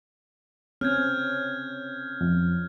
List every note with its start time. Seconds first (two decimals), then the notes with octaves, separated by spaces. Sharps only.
0.81 C4 C#4 F6 G6 G#6
2.21 F2